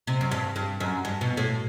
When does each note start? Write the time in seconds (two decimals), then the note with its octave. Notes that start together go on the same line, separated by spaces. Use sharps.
0.07 C3
0.21 F#2
0.31 G2
0.56 G2
0.80 F#2
1.05 G2
1.21 B2
1.37 A2